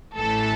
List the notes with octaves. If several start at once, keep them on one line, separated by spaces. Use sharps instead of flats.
A1 A2 E3 A4